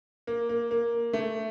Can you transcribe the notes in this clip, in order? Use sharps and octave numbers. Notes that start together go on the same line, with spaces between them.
A#3
A#3
A#3
A3